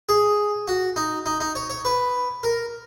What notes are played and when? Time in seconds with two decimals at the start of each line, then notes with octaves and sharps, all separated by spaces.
0.09 G#4
0.68 F#4
0.96 D#4
1.26 D#4
1.40 D#4
1.55 C#5
1.70 C#5
1.85 B4
2.43 A#4